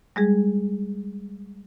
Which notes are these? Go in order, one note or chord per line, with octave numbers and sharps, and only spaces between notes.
G3 G#3 G#4